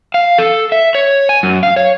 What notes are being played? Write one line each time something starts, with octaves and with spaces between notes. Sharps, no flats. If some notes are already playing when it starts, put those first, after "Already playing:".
F5
A4
E5
C#5
G#5
F#2
F5
C#5